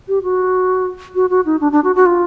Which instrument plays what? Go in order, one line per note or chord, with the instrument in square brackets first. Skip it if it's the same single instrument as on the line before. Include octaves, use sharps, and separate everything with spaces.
[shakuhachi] G4
F#4
F#4
F#4
D#4
D4
D4
F#4
F#4
F4